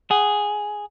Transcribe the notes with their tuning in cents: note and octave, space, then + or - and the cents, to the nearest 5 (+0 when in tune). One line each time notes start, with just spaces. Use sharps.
G#4 +0 F#5 +20